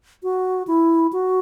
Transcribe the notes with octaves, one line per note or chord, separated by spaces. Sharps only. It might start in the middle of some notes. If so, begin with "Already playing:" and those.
F#4
E4
F#4